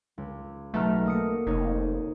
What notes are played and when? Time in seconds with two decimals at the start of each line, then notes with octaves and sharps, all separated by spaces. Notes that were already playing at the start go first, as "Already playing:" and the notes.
0.18 C#2
0.74 B1 A3 A#5 F6
1.05 A#3 D#6 C#7
1.47 F1 D#4 C#5